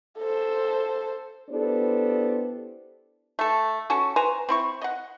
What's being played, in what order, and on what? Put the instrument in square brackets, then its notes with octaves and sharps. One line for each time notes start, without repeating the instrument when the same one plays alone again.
[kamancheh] A4 C5
[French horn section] B3 D4 E4 G4 A4 C5
[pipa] A3 A4
C#4 F#4 A4
B4 C5 G#5 A#5
C4 E4 C#6
D#5 F#5